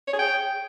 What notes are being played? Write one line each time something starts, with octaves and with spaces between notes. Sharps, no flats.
C#5
G#4
G5